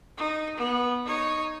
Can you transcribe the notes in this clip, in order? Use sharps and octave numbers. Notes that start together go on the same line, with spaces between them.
D#4
B3
D#4 C#5